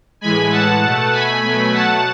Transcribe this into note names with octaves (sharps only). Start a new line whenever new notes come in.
A2 E3 G#3 G#5 B5
F#5 A5
B2 A3
G#5 B5
B2 F#3 A3
F#5 A5